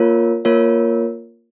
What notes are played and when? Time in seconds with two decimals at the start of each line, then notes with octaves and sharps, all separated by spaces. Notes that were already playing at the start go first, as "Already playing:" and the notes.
Already playing: A#3 F4 A#4 C#5
0.45 A#3 F4 A#4 C#5